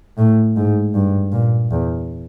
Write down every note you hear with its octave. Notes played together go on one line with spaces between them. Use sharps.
A2
G#2
G2
A#2
E2